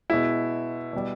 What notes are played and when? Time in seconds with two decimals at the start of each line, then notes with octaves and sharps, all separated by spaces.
0.10 B2 G#3 E4
0.93 B2 G3